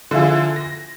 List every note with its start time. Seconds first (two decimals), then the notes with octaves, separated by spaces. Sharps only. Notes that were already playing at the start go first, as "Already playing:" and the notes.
0.11 D3 F3 E4 F4 G#4
0.56 A#6